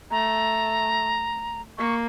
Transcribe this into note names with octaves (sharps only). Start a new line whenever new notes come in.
A3 A#5
A#3 C#6